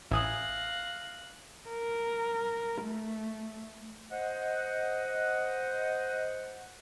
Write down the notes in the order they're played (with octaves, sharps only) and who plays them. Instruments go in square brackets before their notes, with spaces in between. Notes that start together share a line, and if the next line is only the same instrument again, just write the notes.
[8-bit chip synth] A1 [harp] E5 G#5 D#6 [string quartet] F5 F#6 A#6
[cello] A#4
A3
[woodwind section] C5 D#5 F#5